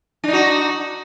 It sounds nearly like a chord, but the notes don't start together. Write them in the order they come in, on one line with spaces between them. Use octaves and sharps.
D4 D#4 F#4